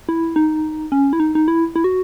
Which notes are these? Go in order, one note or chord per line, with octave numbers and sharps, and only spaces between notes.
E4
D#4
C#4
E4
D#4
D#4
E4
E4
F#4